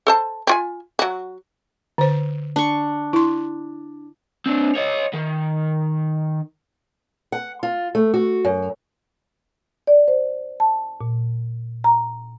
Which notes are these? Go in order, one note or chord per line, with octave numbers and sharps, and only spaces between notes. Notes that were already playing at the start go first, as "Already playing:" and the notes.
A4 C5 A5
C4 F4 G#5
F#3 F#4
D3 C5
D4 C#6
E4 C6
C4 D4
C#5 D#5
D#3
F#5
F4
A3
F#4
F#2
D5
C5
A5
A#2
A#5